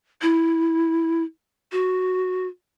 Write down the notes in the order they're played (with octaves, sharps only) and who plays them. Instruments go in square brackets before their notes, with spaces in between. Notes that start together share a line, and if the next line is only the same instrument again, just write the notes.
[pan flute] E4
F#4